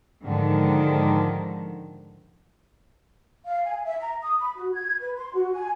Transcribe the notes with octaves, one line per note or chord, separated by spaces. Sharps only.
G#2 D3 D#3 F3
F5
G#5
E5
A#5
D#6
B5
F#4
G#6
B4
C6
F#4
G#5